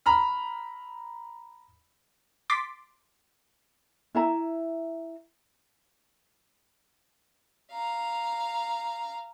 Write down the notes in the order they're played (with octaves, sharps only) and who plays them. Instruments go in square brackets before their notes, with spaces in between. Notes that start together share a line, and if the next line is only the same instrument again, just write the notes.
[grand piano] A#5 B5 F6
[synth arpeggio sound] C6 D6 A6 B6
[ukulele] E4 E5 A#5
[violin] F5 A#5